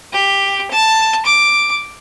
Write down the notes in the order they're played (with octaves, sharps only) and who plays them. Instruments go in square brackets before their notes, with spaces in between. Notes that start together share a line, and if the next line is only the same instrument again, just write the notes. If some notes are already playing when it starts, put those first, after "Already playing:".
[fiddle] G4
A5
D6